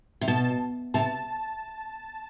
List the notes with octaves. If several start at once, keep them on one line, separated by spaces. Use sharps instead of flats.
C3
B2 A5
C3 A5